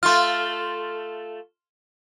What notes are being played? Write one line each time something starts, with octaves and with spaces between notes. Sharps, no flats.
A3 F4 C6 F6